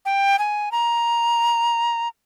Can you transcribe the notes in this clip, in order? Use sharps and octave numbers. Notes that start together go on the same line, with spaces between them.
G5
G#5
A#5